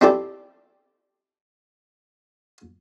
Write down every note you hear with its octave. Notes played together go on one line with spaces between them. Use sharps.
C4 D4 E4 G4 A4 D5